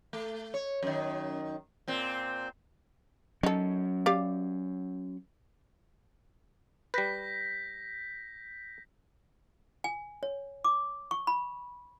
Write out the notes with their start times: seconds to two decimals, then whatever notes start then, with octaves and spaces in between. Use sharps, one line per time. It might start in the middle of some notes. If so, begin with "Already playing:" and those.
0.13 A3
0.54 C#5
0.83 F#2 D#3
1.88 A#2 C4
3.43 F#3 C#4 D#4 A4
4.06 G4 D5 F5
6.94 G3 B4 G6 A#6 B6
9.84 G#5
10.23 C#5
10.64 D6
11.11 C#6
11.27 B5